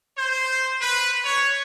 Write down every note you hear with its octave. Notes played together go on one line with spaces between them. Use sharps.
C5
B4
C#5